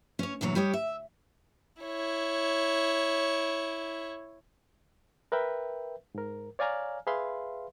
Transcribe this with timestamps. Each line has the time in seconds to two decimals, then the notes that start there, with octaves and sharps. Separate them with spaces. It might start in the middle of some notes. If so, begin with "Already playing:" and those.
0.19 C#4 C#5
0.41 D2 A#2 E3 F#3 C#5
0.55 G3 G4 C#5 D#5
0.74 E5
1.82 E4 C#5
5.32 A#4 B4 E5 G5
6.15 G#2 A#4
6.59 C#5 D5 F5 G#5 A#5 F6
7.07 G#4 B4 E5 F5 B5 C6